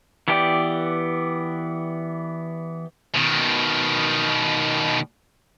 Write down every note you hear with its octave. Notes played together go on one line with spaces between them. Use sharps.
E3 B3 G4 D5
B2 D#3